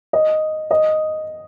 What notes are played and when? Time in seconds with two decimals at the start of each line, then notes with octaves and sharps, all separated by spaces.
0.13 D#5
0.71 D#5